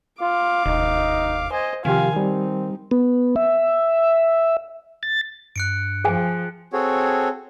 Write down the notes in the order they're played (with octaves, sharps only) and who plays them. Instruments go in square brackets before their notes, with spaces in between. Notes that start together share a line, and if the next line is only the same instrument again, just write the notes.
[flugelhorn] F4 [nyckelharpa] F5 D6
[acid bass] E1 [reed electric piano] D2 [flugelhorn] D#4
[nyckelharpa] C5 D#5 [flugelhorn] G#5
[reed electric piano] C3 F3 G4 [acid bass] D#3 [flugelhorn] F4 [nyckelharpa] F5 G#5
[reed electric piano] G3 [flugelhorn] C4 [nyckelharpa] D#4
[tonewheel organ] B3
E5
A6
[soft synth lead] G2 [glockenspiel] F#6 C#7 D7
[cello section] F3 [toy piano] G#4 G5 G#5
[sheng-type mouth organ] C4 F#4 G#4 A4 C#5